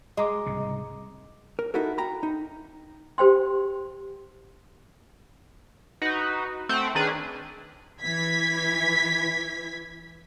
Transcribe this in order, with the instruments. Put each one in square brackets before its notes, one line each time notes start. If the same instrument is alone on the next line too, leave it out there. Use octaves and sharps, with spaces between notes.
[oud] G#3 [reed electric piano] D#5 A#5 D6
[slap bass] C2 G#2 C#3
[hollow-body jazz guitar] A#4
D#4 E4 F#4 A4 A#4
G5 A#5 B5
D#4
[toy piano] G4 C5 G5 C6
[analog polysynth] D#4 F#4 B4
A3 C4 F#5
D#3 C#4 D4 G#4 B4
[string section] E3 G#6 B6